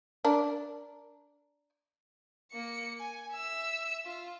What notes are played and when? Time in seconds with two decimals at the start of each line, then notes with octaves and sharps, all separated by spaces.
0.25 D4 A#4
2.52 A#3 C#7
2.99 G#5
3.33 E5 E6
4.05 F4